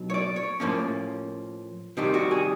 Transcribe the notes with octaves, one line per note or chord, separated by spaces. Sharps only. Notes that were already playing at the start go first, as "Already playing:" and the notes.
Already playing: B1 B2 F#3
C#5
D5
C#5
A2 F3 A#3 C#4
C3 D#3 G3 G4
F#4
G#4